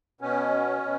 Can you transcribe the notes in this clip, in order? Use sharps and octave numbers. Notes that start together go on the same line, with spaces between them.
B2 C#4
B2